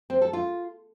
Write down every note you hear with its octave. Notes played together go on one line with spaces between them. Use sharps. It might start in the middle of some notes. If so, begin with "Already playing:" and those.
C4
A4
F4